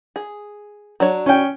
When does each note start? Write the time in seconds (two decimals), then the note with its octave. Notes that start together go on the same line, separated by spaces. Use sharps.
0.16 G#4
1.00 F#3 D4 C#5
1.26 C#4 G5